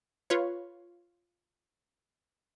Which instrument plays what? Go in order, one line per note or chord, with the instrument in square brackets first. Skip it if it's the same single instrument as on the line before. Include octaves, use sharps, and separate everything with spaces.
[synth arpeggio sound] F4 B4 C#5